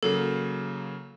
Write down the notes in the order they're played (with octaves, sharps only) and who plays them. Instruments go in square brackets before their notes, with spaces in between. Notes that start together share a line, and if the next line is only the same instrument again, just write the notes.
[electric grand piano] C#3 F#3 A#3 [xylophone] A4